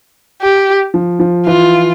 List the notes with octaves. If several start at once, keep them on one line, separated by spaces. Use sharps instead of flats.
G4
F3
F3
E3 F4